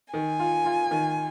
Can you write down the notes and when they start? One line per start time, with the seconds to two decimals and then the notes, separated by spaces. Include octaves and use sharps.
0.14 D#3 G#5
0.39 F4
0.65 F4
0.91 D#3